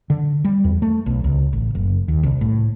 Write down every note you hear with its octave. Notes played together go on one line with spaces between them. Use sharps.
D3
G3
E2
A3
B1
C#2
A1
F#1
D#2
C2
A2